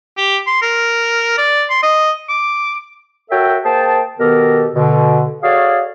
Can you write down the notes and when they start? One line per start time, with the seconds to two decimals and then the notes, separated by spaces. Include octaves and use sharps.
0.17 G4
0.46 C6
0.62 A#4
1.38 D5
1.70 C6
1.83 D#5
2.29 D6
3.31 F#4 A4 A#4 C#5 E5 G5
3.65 A#3 G#4 C5 G5 A5
4.19 B2 D#3 B3 G4 A4 A#4
4.74 B2 D3
5.43 F#4 G#4 A4 C#5 D5 F5